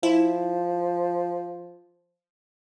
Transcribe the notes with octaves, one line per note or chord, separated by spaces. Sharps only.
F3 E4